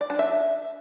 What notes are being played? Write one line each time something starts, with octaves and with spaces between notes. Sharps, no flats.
D5
D4
E5